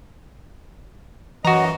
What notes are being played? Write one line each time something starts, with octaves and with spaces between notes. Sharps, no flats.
F#2 E3 F#4 D#5 A#5